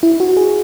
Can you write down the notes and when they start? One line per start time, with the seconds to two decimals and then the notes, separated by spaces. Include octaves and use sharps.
0.03 E4
0.20 F#4
0.37 G#4